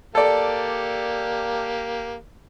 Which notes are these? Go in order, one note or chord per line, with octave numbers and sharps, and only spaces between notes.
A#3 G4 A4 D5